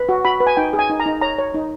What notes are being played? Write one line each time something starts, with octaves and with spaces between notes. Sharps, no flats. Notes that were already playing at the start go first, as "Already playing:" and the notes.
Already playing: B4
F#4
F#4 B5
B4
G#5
D#4 G5
G#4
G#5
D#4
A#5
D#4
C#5 A#5
C#5
D#4